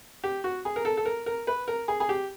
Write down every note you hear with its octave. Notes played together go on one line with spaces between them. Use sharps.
G4
F#4
G#4
A#4
A4
A4
A#4
A#4
B4
A#4
G#4
G#4
G4